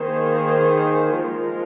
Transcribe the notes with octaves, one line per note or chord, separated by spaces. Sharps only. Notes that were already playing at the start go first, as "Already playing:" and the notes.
Already playing: D#3 A#3 G#4 C5
F3 G#3 F4 A#4